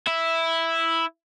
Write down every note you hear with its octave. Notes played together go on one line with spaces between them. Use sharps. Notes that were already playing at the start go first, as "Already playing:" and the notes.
E4